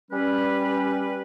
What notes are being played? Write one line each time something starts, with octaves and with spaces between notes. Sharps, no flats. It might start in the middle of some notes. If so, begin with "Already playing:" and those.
G3 C#4 B4